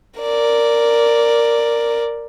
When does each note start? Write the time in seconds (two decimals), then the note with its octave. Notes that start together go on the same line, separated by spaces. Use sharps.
0.20 A#4 D5